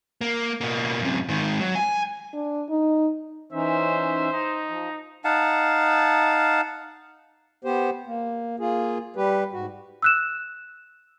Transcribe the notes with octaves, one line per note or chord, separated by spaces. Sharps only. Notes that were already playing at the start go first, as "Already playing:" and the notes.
A#3
B2 A#3
F#2 C3
G#2 D#3
F#3
G#5
D4
D#4
E3 C#4 D#4 C5 E5
D#4
F3
D#4 F5 F#5 A5
B3 G4 C5
A#3
A#3 F4 G#4
G3 G4 B4
G#2 F#4
E6 F#6 E7